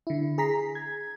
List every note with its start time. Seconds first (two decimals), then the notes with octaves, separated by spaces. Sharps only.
0.07 D3 E4
0.38 G#4 A#5 B6 C7
0.75 G#6